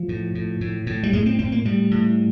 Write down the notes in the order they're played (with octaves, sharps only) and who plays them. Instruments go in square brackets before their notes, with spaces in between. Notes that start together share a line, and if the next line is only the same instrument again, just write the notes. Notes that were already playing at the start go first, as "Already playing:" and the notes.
Already playing: [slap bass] F3
A2
A2
A2
A2
G3
A2 G#3
C4
A2 C4
A#3
A2 G3
A2